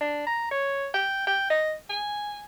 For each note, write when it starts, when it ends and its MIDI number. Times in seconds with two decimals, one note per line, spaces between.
0.01 0.22 62
0.27 0.50 82
0.51 0.87 73
0.94 1.22 79
1.27 1.45 79
1.50 1.74 75
1.90 2.42 80